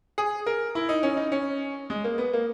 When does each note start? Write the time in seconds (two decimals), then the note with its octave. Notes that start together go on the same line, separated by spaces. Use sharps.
0.18 G#4
0.46 A#4
0.75 E4
0.89 D#4
1.03 C#4
1.17 D#4
1.32 C#4
1.90 G#3
2.04 A#3
2.18 B3
2.33 A#3